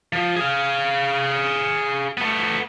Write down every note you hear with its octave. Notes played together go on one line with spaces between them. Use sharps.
F3
G#4 F5
A3 B3